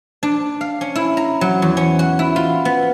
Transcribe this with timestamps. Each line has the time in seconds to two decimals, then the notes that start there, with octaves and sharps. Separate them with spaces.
0.23 D4
0.61 F5
0.81 C#4
0.96 E4
1.17 A#5
1.41 F#3
1.62 E2
1.77 C#4
1.99 F#4
2.19 E4
2.36 F4
2.65 B3